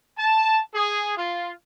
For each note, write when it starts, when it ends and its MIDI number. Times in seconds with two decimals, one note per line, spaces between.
0.17 0.60 81
0.73 1.13 68
1.17 1.51 65